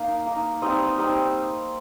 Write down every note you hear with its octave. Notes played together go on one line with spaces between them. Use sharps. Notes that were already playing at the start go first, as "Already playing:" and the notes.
Already playing: A#3 D#4 F5
A#3 D#4
G3 C4 D#4 D#5
G3 C4 D#4